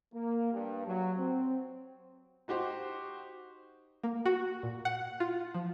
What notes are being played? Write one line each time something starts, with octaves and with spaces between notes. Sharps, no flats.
A#3
G2
F#3
C4
D#4 F#4 G4 C5
A#3
F#4
A#2
F#5
F4
F3